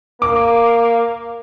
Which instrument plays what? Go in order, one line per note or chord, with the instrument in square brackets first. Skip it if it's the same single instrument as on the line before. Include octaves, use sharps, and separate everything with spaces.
[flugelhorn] A#3 [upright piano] D6